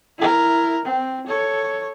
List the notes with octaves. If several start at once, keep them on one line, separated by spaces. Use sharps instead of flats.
E4 A#4
C4
A4 C#5